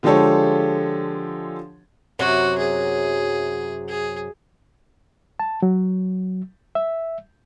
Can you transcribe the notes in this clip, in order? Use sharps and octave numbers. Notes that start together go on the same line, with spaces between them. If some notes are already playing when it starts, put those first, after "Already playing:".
D3 F3 G#3 G4 A4 C#5
F#2 C3 F#3 F#4
G#4
G#4
A5
F#3
E5